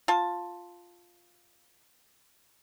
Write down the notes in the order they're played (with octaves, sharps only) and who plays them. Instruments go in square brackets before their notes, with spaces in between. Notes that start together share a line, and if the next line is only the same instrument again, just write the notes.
[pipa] F4 A5